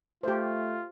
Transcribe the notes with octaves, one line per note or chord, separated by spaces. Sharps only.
A3 F4 G4 C5